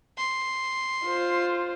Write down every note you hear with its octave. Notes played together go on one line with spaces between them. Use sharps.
C6
F4 C5